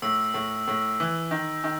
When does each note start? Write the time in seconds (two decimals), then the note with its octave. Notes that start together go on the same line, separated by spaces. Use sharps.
0.02 A2 E6
0.34 A2
0.68 A2
1.00 E3
1.31 D#3
1.64 D#3